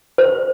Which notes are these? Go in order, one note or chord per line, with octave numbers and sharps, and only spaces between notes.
C5